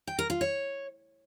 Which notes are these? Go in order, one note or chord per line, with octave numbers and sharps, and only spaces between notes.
G5
A#4
F4
C#5